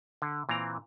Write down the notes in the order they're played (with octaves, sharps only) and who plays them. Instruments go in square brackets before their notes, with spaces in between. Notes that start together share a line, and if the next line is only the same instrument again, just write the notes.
[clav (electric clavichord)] D3
A#2 E3 C4 A#5